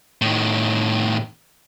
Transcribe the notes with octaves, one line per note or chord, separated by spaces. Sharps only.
A2 D#3